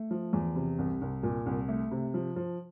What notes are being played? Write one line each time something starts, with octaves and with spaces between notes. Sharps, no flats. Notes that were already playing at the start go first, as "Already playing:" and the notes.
Already playing: A3
F3
E2
C3
C2
C2
A#2
C2
A3
C3
F3
F3